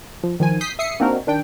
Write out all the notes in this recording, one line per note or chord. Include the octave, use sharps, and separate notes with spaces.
F3
D#3 F3 G#5
D#6 G6 B6 C7
E5 D#6 C7 C#7
A#3 C4 D4 D#4 F#4 A#4
D#3 D4 G5